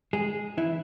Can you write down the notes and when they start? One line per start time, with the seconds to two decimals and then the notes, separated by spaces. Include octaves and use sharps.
0.13 G#3 G#4
0.58 E3 E4